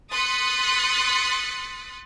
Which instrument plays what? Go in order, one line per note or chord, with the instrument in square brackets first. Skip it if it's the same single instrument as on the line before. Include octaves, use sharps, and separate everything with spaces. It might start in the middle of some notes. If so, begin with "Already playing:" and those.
[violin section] C6 D#6 F#6 A6 B6 C#7